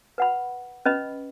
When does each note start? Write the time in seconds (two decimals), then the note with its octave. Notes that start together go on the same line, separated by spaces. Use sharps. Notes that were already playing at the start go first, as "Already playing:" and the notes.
0.18 B4 F#5 B5
0.86 C#4 B4 D#5 B5